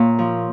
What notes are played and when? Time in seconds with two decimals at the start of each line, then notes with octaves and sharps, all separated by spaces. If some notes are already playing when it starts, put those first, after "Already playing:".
Already playing: A#2 A#4 C#5
0.19 F3